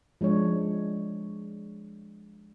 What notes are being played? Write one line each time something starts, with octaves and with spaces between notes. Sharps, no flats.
F3 G#3 D4 C#5